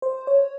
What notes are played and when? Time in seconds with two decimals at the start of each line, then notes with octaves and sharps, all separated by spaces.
0.02 C5
0.27 C#5